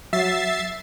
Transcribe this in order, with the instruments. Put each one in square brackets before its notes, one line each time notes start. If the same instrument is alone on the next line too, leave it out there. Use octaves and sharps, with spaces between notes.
[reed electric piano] F#3 [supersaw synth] E5 A6 C7